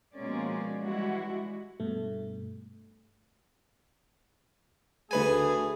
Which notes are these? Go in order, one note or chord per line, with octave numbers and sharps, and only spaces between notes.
B2 F3 G#3 A#3 C#4 D5
E3 G3 G#3 E4 F#4
G2 B2 A3
D2 A3 G#4 B4 G#5